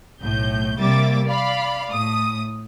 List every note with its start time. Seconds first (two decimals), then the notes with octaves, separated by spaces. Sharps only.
0.19 B1 A2 G6
0.78 C3 G3 A#3 E5 D6 A6
1.27 D5 F5 B5
1.91 A2 D#6